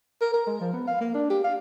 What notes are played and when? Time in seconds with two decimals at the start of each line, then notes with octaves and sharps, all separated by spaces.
0.21 A#4
0.33 A#4
0.47 G#3
0.60 F3
0.73 B3
0.87 F5
1.01 A#3
1.14 D4
1.30 G4
1.44 F5